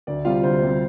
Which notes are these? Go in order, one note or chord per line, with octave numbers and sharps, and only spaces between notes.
D2 D5
C3 G3 C4 F4 F5
D2 C5
C3 G3 C4